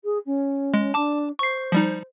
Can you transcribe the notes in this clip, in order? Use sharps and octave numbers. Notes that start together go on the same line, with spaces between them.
G#4
C#4
G#3
D4 A5 D6
C5 C#6 C7
F3 G3 D#4